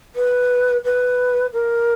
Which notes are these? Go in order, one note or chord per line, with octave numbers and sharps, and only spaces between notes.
B4
B4
A#4